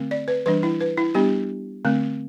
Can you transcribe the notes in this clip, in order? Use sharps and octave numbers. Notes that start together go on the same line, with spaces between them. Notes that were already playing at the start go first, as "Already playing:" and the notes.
Already playing: D3 A3 C4
D5
B4
E3 G3 D4 B4
E4
B4
E4
G3 B3 D4 G4
D3 A3 C4